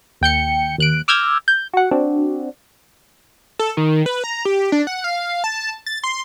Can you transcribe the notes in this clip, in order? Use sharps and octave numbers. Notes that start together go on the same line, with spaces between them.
D#2 G5 G6 C#7
D#2 F#6 D7
D6 E6 F6 G6 G#6 A#6
G6
F#4 F#5
C4 D4 F#4
A4
D#3
B4
A#5
G4
D4
F#5
F5
A5
A6
C6